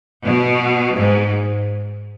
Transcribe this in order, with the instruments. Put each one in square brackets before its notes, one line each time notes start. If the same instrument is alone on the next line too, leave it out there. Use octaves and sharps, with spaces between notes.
[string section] B2
G#2